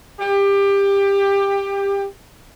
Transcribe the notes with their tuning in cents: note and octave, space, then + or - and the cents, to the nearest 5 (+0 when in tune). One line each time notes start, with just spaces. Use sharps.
G4 +20